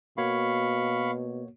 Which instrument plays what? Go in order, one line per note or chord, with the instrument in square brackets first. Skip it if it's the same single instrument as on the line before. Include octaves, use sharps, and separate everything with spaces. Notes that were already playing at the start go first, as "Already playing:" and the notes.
[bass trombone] B2 [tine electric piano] A#3 F#4 C#5 [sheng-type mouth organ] F5 B5 C#6